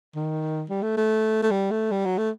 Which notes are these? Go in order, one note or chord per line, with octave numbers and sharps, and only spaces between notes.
D#3
G3
A3
A3
A3
G3
A3
G3
F#3
A3